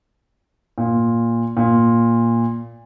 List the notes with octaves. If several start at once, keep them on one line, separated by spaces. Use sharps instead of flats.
A#2
A#2